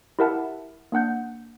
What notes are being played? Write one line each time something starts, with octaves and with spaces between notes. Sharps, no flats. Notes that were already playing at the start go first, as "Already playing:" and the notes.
E4 G4 A#4 E5 F#5 A5
A#3 D4 F#5 G6